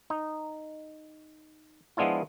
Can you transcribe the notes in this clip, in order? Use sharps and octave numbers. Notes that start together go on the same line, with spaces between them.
D#4
F3 G#3 B3 D4 E4 F4